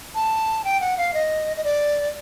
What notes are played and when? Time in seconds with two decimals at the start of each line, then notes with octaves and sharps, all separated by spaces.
0.15 A5
0.64 G5
0.81 F#5
0.97 F5
1.14 D#5
1.57 D#5
1.64 D5